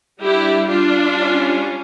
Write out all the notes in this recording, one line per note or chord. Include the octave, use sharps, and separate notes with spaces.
G3 D4 E4 G4
D4 F4
G3 C#4